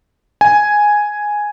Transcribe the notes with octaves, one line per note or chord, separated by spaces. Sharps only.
G#5